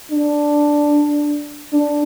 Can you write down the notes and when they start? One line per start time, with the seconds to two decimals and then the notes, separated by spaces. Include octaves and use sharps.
0.11 D4
1.73 D4